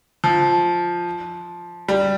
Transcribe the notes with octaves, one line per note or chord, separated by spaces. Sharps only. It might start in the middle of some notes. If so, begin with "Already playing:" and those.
F3
G3